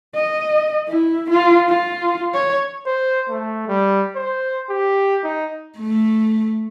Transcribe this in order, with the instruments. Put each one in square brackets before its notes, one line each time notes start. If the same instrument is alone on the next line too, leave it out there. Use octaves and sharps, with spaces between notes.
[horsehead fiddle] D#5
E4
F4
F4
C#5
[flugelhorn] C5
A3
G3
C5
G4
D#4
[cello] A3